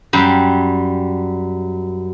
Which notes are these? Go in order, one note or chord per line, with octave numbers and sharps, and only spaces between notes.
F#2 G3